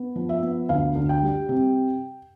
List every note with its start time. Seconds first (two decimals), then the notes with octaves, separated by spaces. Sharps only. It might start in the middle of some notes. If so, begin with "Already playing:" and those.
Already playing: B3
0.16 F3
0.29 E5
0.42 B3
0.69 D2 F5
0.95 D2
1.09 G5
1.23 G3
1.49 C3